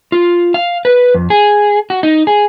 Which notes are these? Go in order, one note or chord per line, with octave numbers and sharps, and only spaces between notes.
F4
F5
B4
F2
G#4
F#4
D#4
G#4